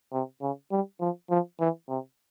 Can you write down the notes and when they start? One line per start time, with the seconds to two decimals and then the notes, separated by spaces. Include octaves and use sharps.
0.13 C3
0.42 C#3
0.71 G3
1.00 F3
1.30 F3
1.60 E3
1.89 C3